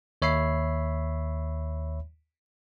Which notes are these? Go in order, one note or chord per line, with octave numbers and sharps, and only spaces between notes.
D#2 C#5 E5 B5 C7